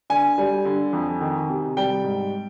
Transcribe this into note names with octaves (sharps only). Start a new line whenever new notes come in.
D3 G#5
G3
D3
F2
D#3
C3
G3 G5
G#2